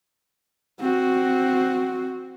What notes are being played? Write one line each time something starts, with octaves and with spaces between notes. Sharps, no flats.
C4 F#4